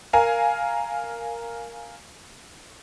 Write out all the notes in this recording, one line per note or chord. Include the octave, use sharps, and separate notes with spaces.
A#4 F5 G#5